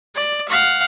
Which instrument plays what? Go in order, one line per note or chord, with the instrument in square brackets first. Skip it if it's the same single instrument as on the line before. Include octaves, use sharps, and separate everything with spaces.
[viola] D5
F5 F#5